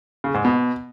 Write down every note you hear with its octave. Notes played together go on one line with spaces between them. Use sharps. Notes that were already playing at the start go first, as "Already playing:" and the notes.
C#3
G#2
B2